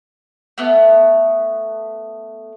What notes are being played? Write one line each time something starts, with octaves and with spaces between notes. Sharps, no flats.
A3 B3